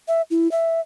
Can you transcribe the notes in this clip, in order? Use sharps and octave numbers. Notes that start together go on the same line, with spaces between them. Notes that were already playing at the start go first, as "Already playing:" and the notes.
E5
E4
E5